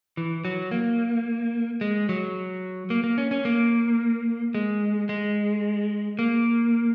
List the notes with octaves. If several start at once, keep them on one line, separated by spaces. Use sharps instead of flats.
E3
F#3
A#3
G#3
F#3
A#3
A#3
C#4
C#4
A#3
G#3
G#3
A#3